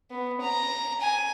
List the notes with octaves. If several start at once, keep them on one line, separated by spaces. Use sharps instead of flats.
B3
A#5
G#5